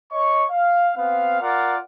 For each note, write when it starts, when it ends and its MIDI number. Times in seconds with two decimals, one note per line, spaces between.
0.12 0.45 73
0.12 0.45 75
0.12 0.45 85
0.50 0.90 77
0.96 1.40 59
0.96 1.40 60
0.96 1.40 77
1.40 1.78 65
1.40 1.78 70
1.40 1.78 74
1.40 1.78 77
1.40 1.78 78